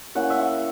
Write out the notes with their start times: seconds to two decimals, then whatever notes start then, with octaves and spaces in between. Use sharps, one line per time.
0.15 A#3 C#4 E4 F#5
0.30 E5
0.40 F#5